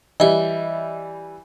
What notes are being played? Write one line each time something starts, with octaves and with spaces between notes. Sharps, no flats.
E3 G3 D#5 E5